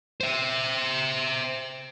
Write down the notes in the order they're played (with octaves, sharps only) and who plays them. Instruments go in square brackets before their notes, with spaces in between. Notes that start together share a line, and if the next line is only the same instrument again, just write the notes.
[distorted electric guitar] C5 E5